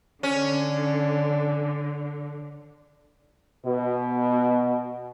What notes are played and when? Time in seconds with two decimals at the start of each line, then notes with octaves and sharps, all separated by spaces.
0.23 D3 C#4
3.66 B2